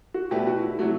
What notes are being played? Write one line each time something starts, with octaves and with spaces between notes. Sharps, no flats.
F#4
B2 A3 E4 G4 B4 D5
F#4
E4
C3 F#3 A3 F#4